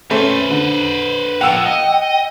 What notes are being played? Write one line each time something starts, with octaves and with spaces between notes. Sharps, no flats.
A3 C4 C#4 B4 C5
D3
F3 A#3 F#5 G5 E6 E7
D#5